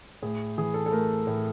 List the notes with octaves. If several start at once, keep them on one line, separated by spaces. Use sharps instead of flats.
A2 G#4
E3 G#4
A4
A4
A3 A#4
A2